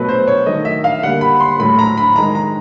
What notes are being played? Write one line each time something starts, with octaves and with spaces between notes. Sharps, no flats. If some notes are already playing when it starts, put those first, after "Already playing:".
Already playing: B2 F#3 A3 B4
C5
C#5
D#3 F#3 A3 D#5
E5
F5
D3 G3 A#3 F#5
B5
C6
A2 F#3 A3 B5
A#5
B5
D#3 G#3 A#5
A#5